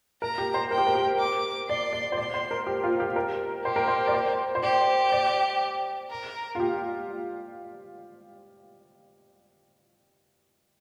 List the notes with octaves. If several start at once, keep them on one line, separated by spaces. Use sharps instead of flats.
A#4 A#5
G4
C5
A#4 G5
G4
A#4
G4
D6
D5 C6
D5
C5
D5 C6
C5
A#4
G4
F4
G4
A#4
G4 C5
A#4
C5
D5
C5
C5
G4 D5
D5
A#4
F4
G4